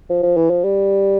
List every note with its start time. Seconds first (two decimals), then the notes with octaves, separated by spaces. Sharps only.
0.10 F3
0.23 F3
0.37 E3
0.50 F3
0.64 G3